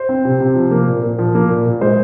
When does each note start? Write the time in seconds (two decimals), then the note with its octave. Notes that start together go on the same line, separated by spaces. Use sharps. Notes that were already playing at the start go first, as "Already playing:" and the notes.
Already playing: C5
0.09 C4
0.25 C3
0.40 C3
0.55 F3
0.71 A#3
0.87 A#2
1.03 A#2
1.19 F3
1.35 A#3
1.49 A#2
1.66 A#2
1.81 G#3 C5